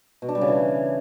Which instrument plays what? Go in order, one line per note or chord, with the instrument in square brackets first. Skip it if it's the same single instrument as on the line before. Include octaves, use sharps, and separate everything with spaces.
[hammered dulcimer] B2
D4
G3
C#3
E3